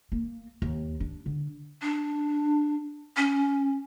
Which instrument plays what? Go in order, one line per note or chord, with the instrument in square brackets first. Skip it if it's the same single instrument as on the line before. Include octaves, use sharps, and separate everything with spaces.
[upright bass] A#3
D#2
D4
D3
[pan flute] D4
C#4